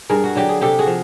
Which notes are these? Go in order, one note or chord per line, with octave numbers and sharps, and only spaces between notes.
G2 G#4 A#4
F#4
D3 F#3 G4
G#4
C3 G4 A4
F#4 G#4
F3